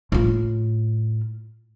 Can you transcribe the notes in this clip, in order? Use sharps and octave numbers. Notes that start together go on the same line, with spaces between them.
A2 F4